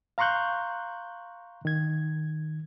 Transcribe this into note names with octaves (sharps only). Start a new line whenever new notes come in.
F5 A#5 C6 C#6 F#6 G6
D#3 G#6